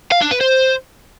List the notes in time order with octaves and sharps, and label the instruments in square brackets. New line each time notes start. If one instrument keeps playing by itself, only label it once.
[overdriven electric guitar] F5
D4
B4
C5